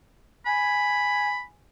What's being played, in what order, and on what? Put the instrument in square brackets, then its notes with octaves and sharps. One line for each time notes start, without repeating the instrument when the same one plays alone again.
[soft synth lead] G#5 [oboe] B5